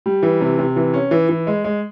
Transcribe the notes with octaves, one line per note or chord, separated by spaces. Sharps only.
G3
E3
C3
C3
E3
C#4
E3
E3
G#3
G#3